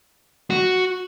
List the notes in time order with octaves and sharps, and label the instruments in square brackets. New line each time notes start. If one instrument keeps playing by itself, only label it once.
[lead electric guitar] F#4